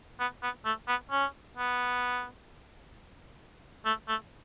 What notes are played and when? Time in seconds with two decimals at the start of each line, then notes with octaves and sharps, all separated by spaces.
0.20 B3
0.42 B3
0.65 A3
0.88 B3
1.11 C#4
1.57 B3
3.85 A3
4.08 A3